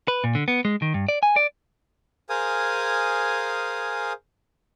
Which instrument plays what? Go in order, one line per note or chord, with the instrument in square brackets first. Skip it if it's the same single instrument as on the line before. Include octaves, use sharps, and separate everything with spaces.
[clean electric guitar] B4
A#2
D3
B3
G#3
D#3
G2
D5
G#5
D5
[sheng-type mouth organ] G#4 A#4 C5 F5 G#5 D#6